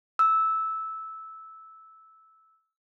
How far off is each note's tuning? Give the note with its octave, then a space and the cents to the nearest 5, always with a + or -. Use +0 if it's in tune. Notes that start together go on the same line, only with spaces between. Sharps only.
E6 -10